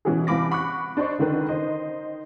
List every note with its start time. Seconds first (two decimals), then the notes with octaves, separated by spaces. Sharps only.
0.05 B2 E3 C#4 F#4 G#4
0.27 C2 E3 F5 B5 D6 A#6
0.51 F#5 B5 C#6 D6 F#6
0.97 D4 C5 D#5 C#6
1.18 C#2 D3 D#3 B4
1.48 D#3 C5 D#5